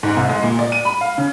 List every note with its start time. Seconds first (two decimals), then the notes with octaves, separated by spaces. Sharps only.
0.03 G#2
0.17 C2
0.29 G#3
0.43 A#2
0.59 D5
0.72 D#7
0.85 B5
1.01 F5
1.18 C#3